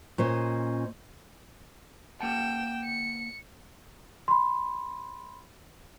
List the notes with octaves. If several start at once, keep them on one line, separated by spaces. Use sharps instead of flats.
A#2 C#4 C5 D#5
A#3 F#5 G5 A5 E7
C#7
B5 C6